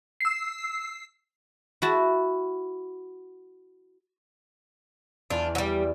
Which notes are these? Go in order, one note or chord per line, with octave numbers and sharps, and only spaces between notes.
E6 C7
E4 F#4 A5
E2 D4 F4
F#3 G3